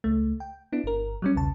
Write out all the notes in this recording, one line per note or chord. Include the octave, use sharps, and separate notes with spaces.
C#2 A3
G5
B3 D4 E4
G1 A#4
F#3 G3 C#4
B1 E2 C#3 A5